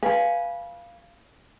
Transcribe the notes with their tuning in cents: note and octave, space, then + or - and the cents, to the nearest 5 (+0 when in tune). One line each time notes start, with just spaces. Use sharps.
B4 -20 F5 -10 G#5 +0